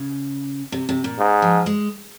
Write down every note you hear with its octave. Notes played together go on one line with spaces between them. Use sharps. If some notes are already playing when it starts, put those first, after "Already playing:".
Already playing: C#3
C3
C3
A#2
G#2
F3
G#3